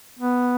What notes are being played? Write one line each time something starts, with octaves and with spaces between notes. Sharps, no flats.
B3